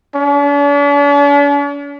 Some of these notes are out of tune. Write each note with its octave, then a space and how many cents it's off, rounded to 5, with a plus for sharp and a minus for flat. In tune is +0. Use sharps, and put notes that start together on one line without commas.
D4 -45